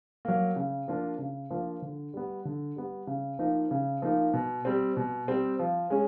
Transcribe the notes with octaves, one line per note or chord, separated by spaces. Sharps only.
F#3 A#3
C#3
F3 A#3 D4 F4
C#3
F3 A#3 D4 F4
D3
G3 B3
D3
G3 B3
C#3
F3 A#3 D#4
C#3
F3 A#3 D#4
B2
G3 C4
B2
G3 C4
F3
G#3 C#4